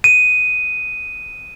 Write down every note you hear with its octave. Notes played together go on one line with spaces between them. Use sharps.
D#7